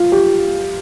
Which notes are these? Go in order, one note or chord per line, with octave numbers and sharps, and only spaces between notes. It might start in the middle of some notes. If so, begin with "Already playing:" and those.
Already playing: F4
G4